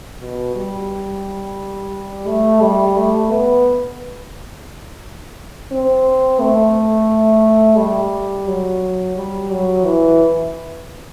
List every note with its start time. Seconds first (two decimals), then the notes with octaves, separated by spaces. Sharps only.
0.20 B2
0.55 G3
2.27 A3
2.61 G3
2.96 A3
3.31 B3
5.71 C4
6.40 A3
7.78 G3
8.47 F#3
9.16 G3
9.50 F#3
9.85 E3